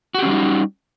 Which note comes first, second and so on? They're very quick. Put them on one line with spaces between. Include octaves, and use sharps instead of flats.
F#4 G4 C#4 G3 D#4